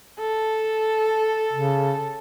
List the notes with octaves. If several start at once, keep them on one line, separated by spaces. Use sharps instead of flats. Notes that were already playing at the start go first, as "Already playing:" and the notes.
A4
C#3